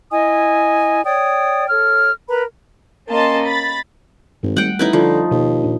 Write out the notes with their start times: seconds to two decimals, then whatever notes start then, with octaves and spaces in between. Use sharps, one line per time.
0.10 E4 D#5 G#5 D#6
1.04 C#5 D5 G5 D#6
1.69 A4 C#5 F6
2.28 A#4 B4 A#5 B5
3.08 A#3 C#4 D#5 A5 C6
3.46 B5 A6
4.43 G#1 G2
4.57 G3 A3 F#5 G5
4.79 A1 D#4 E4 B4
4.93 D3 F3
5.31 D#2 B2
5.64 A#2 D4